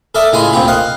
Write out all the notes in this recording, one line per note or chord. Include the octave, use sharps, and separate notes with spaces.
A4 A#4 D5 E5 A5 D#6
A2 C#3 G#3 F4 G#5 B5
D2 A#2 C4 F4 G4 B5
D#5 F5 F#5